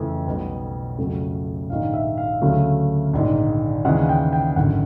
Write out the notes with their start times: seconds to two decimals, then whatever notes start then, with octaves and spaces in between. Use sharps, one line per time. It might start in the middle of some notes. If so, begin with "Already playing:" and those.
Already playing: F2 C#3 E3 A3
0.27 B1 B2 G3
0.98 F2 C#3 F#3 A3
1.70 A#1 G#2 D#3 F5
1.94 E5
2.18 F5
2.41 D2 C#3 F#3 A3 F5
3.13 A#1 G#2 D#3
3.85 D#2 C#3 E3 G#3 F#5
4.09 G5
4.33 G5
4.56 G#1 F#2 D3 F#5